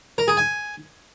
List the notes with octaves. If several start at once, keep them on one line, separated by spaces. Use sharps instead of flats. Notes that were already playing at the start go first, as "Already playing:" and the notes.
A#4
G#4
G#5